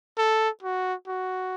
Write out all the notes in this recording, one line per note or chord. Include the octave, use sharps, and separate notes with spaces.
A4
F#4
F#4